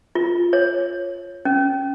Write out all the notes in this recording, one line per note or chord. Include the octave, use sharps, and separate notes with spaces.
F4
C#5
C#4